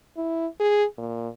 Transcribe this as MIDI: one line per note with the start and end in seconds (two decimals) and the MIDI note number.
0.17 0.47 64
0.60 0.85 68
0.98 1.28 46